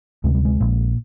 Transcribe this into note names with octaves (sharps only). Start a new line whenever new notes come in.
D2 C3 G#3
G3
G#3
A#1 A#2